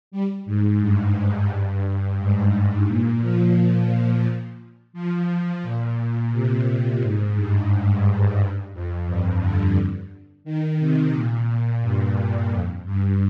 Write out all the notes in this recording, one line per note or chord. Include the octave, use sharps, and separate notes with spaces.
G3
G#2
G2
G2
G#2
A#2
F3
F3
A#2
C3
G#2
G2
G#2
G2
G2
F2
G2
D3
D#3
C3
A#2
A#2
G2
G2
F2
G2